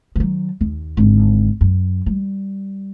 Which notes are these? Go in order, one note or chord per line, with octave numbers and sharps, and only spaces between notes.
D#3 F#3
D#2
G#1 D3
F#2
G3